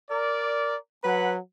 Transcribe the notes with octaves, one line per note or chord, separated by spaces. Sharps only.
A#4 D5
F#3 B4 F#5 B5